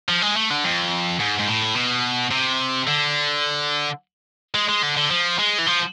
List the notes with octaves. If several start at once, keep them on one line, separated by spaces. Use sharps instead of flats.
F3
G#3
A3
D3
F2
G#2
G#2
A2
B2
C3
D3
G#3
G#3
D3
D3
F3
G#3
E3
F3